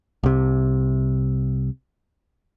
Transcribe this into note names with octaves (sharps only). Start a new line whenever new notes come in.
C2 C3